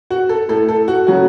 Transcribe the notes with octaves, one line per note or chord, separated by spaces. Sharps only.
F#4
A4
A2 A3 A4
A4
F#4
C#3 F#3 A3 F#4